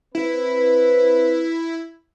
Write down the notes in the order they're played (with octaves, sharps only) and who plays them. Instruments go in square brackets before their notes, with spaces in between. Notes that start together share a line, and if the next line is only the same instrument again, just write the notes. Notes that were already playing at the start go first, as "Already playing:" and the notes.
[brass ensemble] C4 B4 [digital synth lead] E4